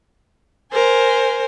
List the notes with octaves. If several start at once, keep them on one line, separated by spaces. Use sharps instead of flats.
A#4 C5 G#5